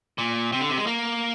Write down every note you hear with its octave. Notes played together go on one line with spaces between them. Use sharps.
A#2
C3
D3
C3
G#3
A#3